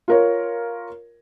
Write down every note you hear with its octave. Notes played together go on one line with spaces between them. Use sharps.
F4 A#4 C#5